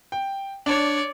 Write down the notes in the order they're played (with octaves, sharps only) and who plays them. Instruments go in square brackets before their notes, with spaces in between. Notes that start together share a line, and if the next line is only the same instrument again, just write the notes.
[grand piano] G5
[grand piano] D4 [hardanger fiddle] C#5 D5